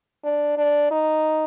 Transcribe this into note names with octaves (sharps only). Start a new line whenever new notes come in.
D4
D4
D#4